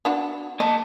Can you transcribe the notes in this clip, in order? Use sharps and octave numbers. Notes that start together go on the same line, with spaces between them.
B3 D4 F#4
A#3 D#5 A5